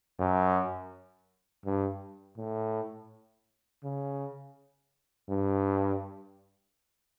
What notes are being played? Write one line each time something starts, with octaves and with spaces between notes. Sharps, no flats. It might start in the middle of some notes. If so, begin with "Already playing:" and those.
F#2
G2
A2
C#3
G2